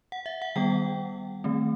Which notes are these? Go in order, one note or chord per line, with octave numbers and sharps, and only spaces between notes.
F#5
E5
F#5
D#3 G3 B3 G5
D#3 A3 C4